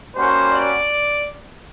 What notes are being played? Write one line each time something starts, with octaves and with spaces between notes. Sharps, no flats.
G3 A#3 C#4 F#4 C5
D5